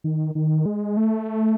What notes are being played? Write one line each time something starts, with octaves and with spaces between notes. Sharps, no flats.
D#3
D#3
G#3
A3